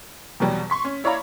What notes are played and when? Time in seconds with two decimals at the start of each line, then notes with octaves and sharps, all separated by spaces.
0.40 E2 B2 F#3 G3
0.70 C6 C#6 B6
0.84 C#4
1.04 E4 C#5 D5 F5 A#5 B5